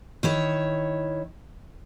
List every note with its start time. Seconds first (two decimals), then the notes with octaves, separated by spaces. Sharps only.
0.23 D#3 E4 C#5